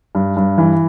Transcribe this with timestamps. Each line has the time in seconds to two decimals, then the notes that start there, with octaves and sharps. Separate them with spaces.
0.15 G2
0.37 G2
0.58 E3